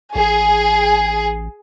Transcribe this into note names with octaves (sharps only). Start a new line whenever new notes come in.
A1 G#4 G#5